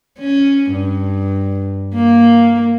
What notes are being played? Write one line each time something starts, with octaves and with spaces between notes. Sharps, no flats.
C#4
G2
A#3